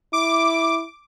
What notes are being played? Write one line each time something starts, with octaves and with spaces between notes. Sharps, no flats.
E4 D6